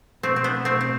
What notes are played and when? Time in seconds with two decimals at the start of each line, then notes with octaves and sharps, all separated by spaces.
0.23 B2 A3 C4
0.36 C4
0.44 B3 D4
0.65 A3 C4
0.81 C4